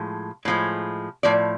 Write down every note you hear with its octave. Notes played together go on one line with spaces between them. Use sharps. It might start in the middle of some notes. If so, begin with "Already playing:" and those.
Already playing: A2 F3 G#3
A2 F3 G#3
A2 F3 D5